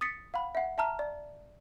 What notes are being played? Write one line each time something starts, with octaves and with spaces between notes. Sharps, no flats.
D#6 A6 B6 C#7
F5 F#5 B5
E5 F#5
E5 A5 A#5 F6
D5